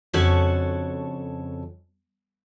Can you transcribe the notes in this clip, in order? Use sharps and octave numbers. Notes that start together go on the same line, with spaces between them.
F2 C#3 D4 F#4 A4 C#5